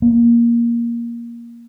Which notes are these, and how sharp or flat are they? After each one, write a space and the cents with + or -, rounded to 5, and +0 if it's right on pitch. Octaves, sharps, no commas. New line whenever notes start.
A#3 +15